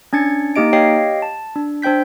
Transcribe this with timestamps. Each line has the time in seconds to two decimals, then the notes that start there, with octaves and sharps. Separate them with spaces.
0.13 C#4 D4 G#6 A6 C#7
0.56 A#3 D#4 G4 D#5 D7
0.73 G4 C#5 D#5 F5 G5 C7
1.22 A5
1.56 D4
1.82 D4 C5 G5 G6 B6